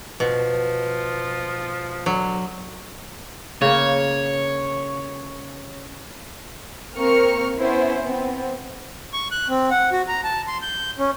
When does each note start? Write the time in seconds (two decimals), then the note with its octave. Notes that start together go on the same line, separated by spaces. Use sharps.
0.20 B2 F3
2.06 D3 F#3
3.62 C#3 A#3 C#5
6.97 A#3 C4 A#4 C#6 F6 C#7
7.58 B3 C#4 E4 C5
8.02 B3 C4
9.13 C#6
9.31 F#6
9.49 C4
9.71 F#5
9.92 F#4
10.08 A#5
10.24 A5
10.47 C6
10.62 G6
10.98 C#4